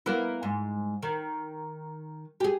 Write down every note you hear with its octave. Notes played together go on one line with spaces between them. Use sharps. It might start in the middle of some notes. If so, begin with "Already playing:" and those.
A#3 B3 E4
G#2
D#3
G4 G#4